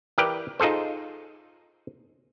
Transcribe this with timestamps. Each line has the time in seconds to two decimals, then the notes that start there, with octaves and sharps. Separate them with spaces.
0.18 E3 G4 A#4 B4 D5 G5
0.60 D#4 F4 G#4 A4 C5